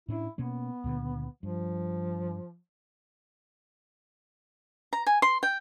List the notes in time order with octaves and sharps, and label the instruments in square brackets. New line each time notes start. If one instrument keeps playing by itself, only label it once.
[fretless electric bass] A2 C#4 D4 [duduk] E4
[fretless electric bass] B2 A#3 C#4 [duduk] B3
[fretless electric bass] C#2 A#2 D3
[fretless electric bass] G2 [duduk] F3
[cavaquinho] A#5
G#5
C6
G5